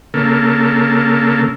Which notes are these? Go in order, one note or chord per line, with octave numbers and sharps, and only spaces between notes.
C#3 A#3 A4